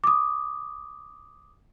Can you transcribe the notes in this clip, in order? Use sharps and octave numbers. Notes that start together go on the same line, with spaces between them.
D6 D#6